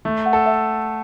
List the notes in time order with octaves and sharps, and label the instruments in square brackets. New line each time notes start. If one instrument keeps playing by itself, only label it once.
[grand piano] A3
[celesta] F#5
[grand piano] A4
[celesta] E5